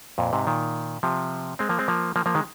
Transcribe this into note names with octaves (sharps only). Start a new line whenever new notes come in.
F2 A#2
G#2 C3
A#2 D#3
C3 F3
G#3 C4
F3 A#3
G#3 C4
F3 A#3
F3 A#3
F3 A#3
D#3 G#3